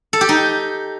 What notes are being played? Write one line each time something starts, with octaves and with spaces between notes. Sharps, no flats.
A4
G4
D#4